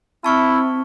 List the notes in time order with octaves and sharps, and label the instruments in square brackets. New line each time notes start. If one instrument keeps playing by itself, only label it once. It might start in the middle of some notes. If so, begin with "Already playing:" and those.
[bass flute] C4 [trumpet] E4 [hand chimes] A5 C#6 F6